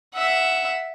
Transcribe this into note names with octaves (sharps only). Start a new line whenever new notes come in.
E5 F#5